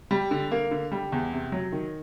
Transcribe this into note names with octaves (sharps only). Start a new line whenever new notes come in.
G3
D3
A#3
D3
G3
E2
C3
F#3
D#3